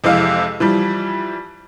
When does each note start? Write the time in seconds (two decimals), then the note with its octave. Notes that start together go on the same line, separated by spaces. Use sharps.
0.04 F2 C3 E3 G#3 F5
0.60 E3 F3 G3